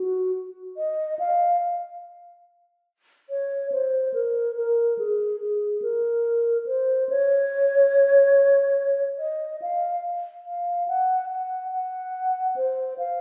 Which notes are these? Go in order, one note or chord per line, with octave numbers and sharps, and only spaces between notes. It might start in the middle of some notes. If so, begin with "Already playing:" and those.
Already playing: F#4
D#5
F5
C#5
C5
A#4
A#4
G#4
G#4
A#4
C5
C#5
D#5
F5
F5
F#5
F#5
F#5
C5
F5